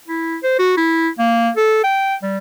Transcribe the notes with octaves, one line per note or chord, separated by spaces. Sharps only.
E4
C5
F#4
E4
A#3
A4
G5
G3